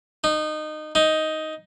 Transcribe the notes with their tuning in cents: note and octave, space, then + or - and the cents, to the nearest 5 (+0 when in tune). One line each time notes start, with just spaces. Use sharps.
D#4 -20
D#4 +10